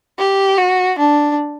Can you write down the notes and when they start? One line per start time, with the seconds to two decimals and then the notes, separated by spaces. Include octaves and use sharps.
0.19 G4
0.58 F#4
0.99 D4